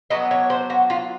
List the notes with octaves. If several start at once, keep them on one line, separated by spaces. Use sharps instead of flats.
F#3 B3 D4 D#5
C#5
C5
F#4
F4